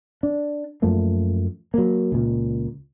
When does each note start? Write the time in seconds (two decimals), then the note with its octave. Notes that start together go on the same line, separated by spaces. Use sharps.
0.23 D4
0.82 F#2 F3 A3 A#3
1.74 F#3 A#3
2.12 C#2 A#2